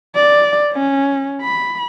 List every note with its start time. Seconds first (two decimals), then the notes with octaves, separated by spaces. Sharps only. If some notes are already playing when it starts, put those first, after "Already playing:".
0.15 D5
0.72 C#4
1.42 B5